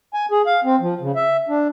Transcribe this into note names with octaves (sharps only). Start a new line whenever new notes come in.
G#5
G#4
F5
C4
F3
C#3
E5
D4